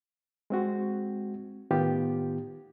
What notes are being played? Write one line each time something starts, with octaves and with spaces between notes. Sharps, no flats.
G#3 C4 F#4
A2 D#3 B3 F4 G4